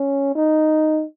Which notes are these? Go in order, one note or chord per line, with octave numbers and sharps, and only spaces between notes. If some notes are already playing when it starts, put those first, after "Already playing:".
Already playing: C#4
D#4